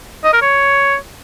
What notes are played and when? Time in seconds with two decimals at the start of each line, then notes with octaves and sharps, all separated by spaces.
0.24 D#5
0.33 A#4
0.42 C#5